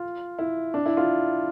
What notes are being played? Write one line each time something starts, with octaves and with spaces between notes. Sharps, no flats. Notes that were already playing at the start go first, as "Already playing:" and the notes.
Already playing: F4
E4
D4
E4
F4